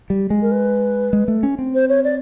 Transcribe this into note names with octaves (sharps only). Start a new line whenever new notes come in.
G3
G#3
A#4
B4
G#3
A3
C#4
C4
C5
C#5
D5